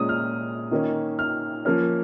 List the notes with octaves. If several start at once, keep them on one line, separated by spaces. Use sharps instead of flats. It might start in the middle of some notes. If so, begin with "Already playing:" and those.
Already playing: A#2 G#3 C#4 D#6
F6
D#3 A#3 C#4
F6
F3 A#3 C#4 F6